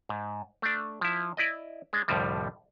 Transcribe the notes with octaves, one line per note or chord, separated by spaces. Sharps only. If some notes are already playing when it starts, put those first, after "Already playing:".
G#2
A3 D4
F3 E4
E4 D5 D#5
G#3 D4
C2 F2 A2 D3 F3 G3